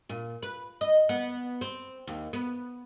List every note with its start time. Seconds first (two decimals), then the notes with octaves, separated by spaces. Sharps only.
0.09 A#2
0.43 B4
0.81 D#5
1.09 B3
1.61 C4
2.07 D#2
2.33 B3